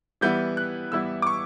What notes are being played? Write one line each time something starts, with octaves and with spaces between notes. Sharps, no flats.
E3 G3 B3 E4 G6
F#6
E3 G3 B3 E4 E6
D6
C#6